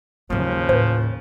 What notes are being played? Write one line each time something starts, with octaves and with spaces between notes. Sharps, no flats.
D#2 G#2 C#3 F3 F#3
A2 B4 C5